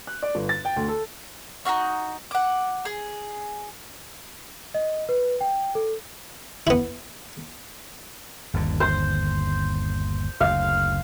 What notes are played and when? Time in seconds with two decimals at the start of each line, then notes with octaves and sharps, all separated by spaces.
0.07 F#6
0.22 D5
0.35 G1
0.49 A6
0.65 G5
0.76 D2
0.88 A4
1.65 D#4 F4 F#4 C#6
2.31 F#5 D6
2.85 G#4
4.74 D#5
5.09 B4
5.41 G5
5.75 A4
6.67 B3 E4
8.54 G1 D#2 D3
8.80 C5
10.41 F#1 D2 F5